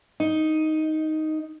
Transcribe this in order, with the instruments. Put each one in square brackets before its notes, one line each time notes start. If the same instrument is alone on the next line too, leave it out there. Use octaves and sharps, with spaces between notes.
[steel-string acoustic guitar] D#4